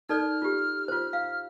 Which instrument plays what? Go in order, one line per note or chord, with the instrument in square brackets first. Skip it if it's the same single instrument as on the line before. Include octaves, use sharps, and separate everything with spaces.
[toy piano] D#4 A4 D5 [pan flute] F6
[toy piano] F4 G4
F4 C5
F5